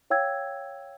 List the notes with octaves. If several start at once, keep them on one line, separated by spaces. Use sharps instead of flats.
C#5 F5 G5 E6 G#6